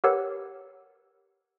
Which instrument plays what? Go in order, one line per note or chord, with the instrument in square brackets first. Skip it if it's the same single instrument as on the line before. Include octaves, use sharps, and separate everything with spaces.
[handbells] G4 A#4 B4 C#5 F#5 E6